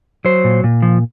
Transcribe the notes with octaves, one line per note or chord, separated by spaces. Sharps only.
F#3 C5
A#2
A#2
F3